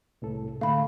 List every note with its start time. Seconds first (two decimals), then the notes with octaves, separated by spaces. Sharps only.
0.22 C2 A2 A4
0.61 D3 A3 F5 B5